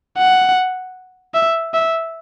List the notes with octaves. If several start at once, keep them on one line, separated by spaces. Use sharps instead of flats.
F#5
E5
E5